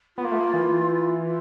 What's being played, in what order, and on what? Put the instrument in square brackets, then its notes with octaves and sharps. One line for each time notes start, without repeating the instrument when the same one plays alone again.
[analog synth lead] B3 [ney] F4
[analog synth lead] A#3
A3
A#3
E3
[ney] F4